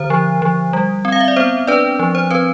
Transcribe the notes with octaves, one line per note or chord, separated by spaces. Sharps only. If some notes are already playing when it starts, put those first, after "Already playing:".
Already playing: D3 C5
F3
F3
G3
C4
F5
E5
D5
B3 C5
D4 B4 D5
F3
C5
C4 B4